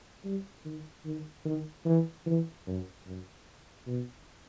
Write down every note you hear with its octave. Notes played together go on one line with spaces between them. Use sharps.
G3
D#3
D#3
D#3
E3
E3
F#2
F#2
B2